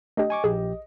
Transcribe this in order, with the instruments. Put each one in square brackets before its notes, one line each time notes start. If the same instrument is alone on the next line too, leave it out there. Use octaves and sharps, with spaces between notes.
[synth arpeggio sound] A3 D4 G4 [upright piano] D#5
[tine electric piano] G#5 C#6 D6
[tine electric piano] A#1 G4 [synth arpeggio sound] G#4